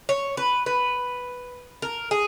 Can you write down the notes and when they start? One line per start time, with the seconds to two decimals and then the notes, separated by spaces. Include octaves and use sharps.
0.09 C#5
0.37 B4
0.66 B4
1.82 A#4
2.11 G#4